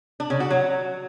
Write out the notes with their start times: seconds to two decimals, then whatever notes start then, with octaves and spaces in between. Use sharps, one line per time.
0.20 D4
0.30 C#3
0.40 F#4
0.51 F#3